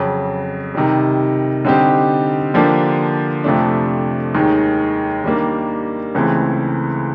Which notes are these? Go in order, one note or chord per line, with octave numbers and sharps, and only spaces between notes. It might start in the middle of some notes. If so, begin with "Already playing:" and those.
Already playing: F2 C#3 F#3
C3 D#3 G3
D3 G3 C4 D#4 G4
D3 F3 A#3 D4 G4
F2 C3 F3 A3 D4
D#2 D#3 G#3
D#3 G3 A#3 D4
C#2 C#3 E3 A3 C4